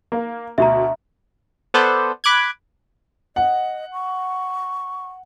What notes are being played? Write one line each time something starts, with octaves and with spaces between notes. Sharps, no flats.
A#3
D2 B2 E5 A#5
B3 A4 B4 C5 D5
B5 D6 F#6 G#6
D#5 F#5
C#6